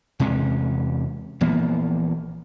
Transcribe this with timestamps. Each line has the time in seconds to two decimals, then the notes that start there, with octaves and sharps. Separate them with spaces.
0.20 E2 C3 G#3 C#4
1.41 A#1 E3 A#3 B3